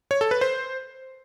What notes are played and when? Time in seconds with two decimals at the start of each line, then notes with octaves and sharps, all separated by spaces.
0.11 C#5
0.21 A4
0.31 B4
0.41 C5